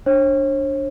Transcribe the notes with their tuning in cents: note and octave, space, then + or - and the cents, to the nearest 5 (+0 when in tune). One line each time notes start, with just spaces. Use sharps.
D4 +0 C#5 -45